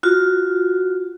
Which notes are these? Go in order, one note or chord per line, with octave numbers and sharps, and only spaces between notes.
F4 F#4